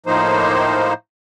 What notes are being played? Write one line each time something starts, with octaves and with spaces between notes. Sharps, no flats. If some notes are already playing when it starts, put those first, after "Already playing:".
A2 F3 A#3 D#4 C5